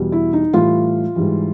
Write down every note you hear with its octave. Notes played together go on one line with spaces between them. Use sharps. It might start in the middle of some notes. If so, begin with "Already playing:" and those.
Already playing: E2 B2 G3
E4
D#4
A2 E3 G3 F4
G#2 E3 G3